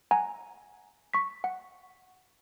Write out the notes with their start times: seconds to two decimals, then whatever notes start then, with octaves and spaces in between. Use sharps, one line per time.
0.11 F#5 G#5 A#5
1.14 C#6 B6
1.44 F#5